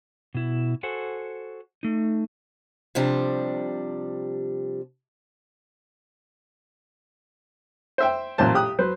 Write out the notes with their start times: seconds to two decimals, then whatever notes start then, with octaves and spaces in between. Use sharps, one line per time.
0.34 B2 E4
0.83 F#4 A4 C5 F#5 G#5
1.83 A3 D#4
2.95 C3 F3 G3 D4
7.98 C5 E5 G5
8.38 A1 A#2 F#3 C5 A5
8.54 G4 D#6 F#6
8.79 F#3 B4 C5